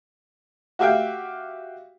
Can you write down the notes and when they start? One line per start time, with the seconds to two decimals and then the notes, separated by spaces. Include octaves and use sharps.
0.79 F#4 G4 E5 F5 G5